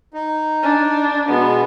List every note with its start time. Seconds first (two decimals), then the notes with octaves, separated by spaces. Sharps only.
0.14 D#4
0.63 D4
1.29 B2 G#3 B3